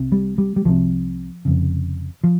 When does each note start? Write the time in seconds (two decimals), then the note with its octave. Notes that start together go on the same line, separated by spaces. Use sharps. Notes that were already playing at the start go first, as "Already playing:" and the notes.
Already playing: C2 C3
0.12 G3
0.38 G3
0.56 G3
0.65 C2 C3 F3
1.45 F1 F2 C#3
2.24 F3